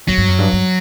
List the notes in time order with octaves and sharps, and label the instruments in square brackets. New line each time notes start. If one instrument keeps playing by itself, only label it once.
[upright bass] F#2 [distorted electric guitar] F#3
[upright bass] G2
F#2
G2
G2